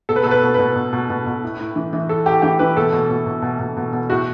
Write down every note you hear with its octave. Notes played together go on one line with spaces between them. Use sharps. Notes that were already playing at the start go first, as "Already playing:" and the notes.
B2 A4
B4
B2 A4
B4
B2
B2 B4
B2
B2
B2
B2
A2
A2
E3
E3
A2 A4
A2 G4
E3 G4
E3 B4
B2 A4
B2
B2
B2
B2
B2
B2
B2
A2 F#4